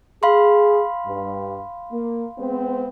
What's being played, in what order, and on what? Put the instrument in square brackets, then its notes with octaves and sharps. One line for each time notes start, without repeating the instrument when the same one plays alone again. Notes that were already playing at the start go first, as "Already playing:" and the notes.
[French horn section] G#4 [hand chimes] F5 B5 C6
[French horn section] G2
A#3
G#3 B3 C4